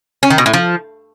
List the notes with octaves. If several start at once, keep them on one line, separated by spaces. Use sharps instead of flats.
C#4
D#3
B2
A2
F3